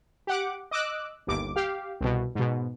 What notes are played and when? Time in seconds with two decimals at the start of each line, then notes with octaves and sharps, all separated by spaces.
0.27 G4 F#5 D6
0.71 D#5 D6 E6 F#6
1.27 G1 D#2 D6
1.56 G4 F5
2.01 C2 B2
2.35 G#2 B2